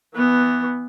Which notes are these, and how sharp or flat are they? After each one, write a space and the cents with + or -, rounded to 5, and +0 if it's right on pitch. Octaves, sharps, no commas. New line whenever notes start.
E3 -5 B3 +0